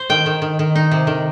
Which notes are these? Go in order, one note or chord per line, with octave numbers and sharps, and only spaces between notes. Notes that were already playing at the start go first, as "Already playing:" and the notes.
Already playing: C5
D#3 G5
D#3
D#3
D#3
D#4
C3
D#3